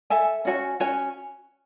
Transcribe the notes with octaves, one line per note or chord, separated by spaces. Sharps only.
A4 E5 G#5
C#4 F#4 C#5 G#5
C#4 F#4 C#5 G#5